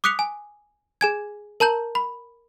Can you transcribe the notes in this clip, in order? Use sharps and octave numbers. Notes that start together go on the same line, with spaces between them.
D6 D#6 F#6 B6 C#7 F7
G#5
G#4 G#5 G#6
A#4 A5 A#5 G6 F#7
B5